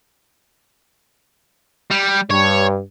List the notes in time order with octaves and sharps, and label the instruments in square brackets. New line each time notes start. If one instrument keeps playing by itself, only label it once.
[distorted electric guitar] G3
[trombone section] G2 [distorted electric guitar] C#5